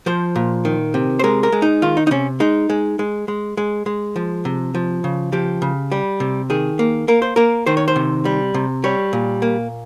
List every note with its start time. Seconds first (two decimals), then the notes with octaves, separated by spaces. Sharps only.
0.06 F3 C5
0.36 A#2
0.65 D#3
0.94 C3
1.19 C5
1.24 G#3 A#4
1.43 A#4
1.52 G#3
1.62 D#4
1.82 D#3 F4
1.97 D#4
2.07 D#4
2.11 C3 C#4
2.40 G#3 D#4
2.70 G#3
2.99 G#3
3.28 G#3
3.57 G#3
3.86 G#3
4.16 F3
4.45 C3
4.75 F3
5.04 C#3
5.32 F3 G4
5.62 C#3
5.92 G3
6.20 C3
6.50 D#3 G#4
6.79 A#3
7.08 A#3 A#4
7.22 C5
7.36 A#3 A#4
7.66 D#3 C5
7.77 C#5
7.88 C5
7.96 C3
8.25 G3
8.54 C3
8.84 G3 C#5
9.13 A#2
9.42 A#3